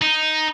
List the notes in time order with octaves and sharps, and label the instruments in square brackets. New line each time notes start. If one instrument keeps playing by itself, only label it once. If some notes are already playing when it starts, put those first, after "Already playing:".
[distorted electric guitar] D#4